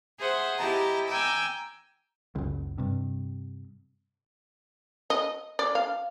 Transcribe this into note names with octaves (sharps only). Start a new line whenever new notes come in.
G#4 C5 E5 F#5
E4 G4 D#5 A5 A#5
G5 G#5 A#5 D6 E6
F#1 C#2
G2 C3
D#5
D5
F5